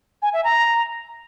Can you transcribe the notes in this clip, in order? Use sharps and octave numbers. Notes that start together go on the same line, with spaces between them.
G#5
E5
A#5